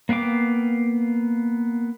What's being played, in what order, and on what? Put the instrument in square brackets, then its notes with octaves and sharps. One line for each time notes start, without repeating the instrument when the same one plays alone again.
[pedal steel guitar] A#3 B3 F5 G5 D6